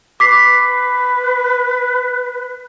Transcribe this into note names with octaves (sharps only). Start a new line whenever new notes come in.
B4 D6 B6 C7